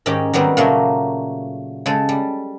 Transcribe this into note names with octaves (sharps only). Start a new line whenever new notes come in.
G#2 D#3 C#4 D#4 G4
D#3 F#3 G3 B3 C4
A#2 C#3 F#3 A3 A#3
C#3 G#3 A4
G3